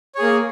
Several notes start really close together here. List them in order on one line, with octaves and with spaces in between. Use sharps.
C#5 G#4 A#3